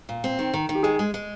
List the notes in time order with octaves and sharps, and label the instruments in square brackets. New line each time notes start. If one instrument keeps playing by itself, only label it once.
[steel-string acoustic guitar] A#2
C4
D#3
D#3
D#3
[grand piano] G4
[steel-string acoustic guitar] G#3 [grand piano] G#4
[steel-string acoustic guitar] G#3
G#3